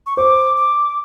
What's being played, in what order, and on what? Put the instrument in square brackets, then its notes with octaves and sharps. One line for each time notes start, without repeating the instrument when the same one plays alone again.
[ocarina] C#6
[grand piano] C5 [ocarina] D6
[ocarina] D6